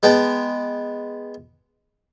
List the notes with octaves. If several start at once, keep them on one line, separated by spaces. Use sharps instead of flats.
G#3 B3 G5 A5